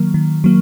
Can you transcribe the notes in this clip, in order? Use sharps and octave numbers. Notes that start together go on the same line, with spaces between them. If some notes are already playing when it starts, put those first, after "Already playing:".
Already playing: D#3 F#3 A#3
D#3
F#3 A#3